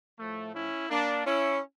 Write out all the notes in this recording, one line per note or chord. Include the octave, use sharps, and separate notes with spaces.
A2 F3 A3
C#4 E4
A#3 D4
C#4 E4